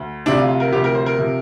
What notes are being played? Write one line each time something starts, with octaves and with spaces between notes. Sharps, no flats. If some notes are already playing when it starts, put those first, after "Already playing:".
Already playing: D2
D2 C3 F3 D4
F4
F4
A#4
D2 C3 F3 G4
A#4
C5
A#4
C3 F3